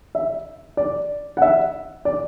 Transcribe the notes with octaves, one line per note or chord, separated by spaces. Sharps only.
E5
D5
F#5
E5
D5